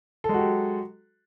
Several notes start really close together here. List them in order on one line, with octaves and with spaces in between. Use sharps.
A4 G#3 F#4 G4 F#3